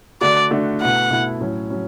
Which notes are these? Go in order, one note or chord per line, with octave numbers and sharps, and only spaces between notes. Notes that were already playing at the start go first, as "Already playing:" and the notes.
D3 A3 D4 F#4 D5
D3 A3 D4 F#4
B2 A3 E4 F#5
B2 A3 E4
A2 F#3 C#4
F#3 C#4